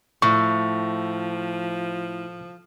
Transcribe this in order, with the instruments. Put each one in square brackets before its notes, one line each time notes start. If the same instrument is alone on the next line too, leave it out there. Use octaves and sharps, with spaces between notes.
[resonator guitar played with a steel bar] A2 [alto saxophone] F3 [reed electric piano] C#6